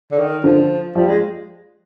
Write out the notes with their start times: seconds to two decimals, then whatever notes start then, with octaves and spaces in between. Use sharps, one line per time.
0.11 D3
0.18 D#3
0.44 D3 F3
0.95 F3 G3
1.08 G#3